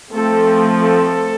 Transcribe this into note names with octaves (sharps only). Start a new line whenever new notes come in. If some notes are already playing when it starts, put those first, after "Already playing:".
F3 A3 C4 A4
A4